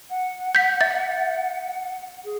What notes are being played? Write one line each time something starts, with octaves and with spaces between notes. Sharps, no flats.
F#5
G6 B6
E5 A6
G#4